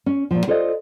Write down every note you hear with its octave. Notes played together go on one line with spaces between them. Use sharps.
C#4
A#2 F3
F4 A4 C5 D5 D#5